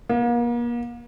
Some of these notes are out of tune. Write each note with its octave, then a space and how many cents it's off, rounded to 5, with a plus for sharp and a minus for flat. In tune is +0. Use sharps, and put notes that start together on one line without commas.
A#3 +40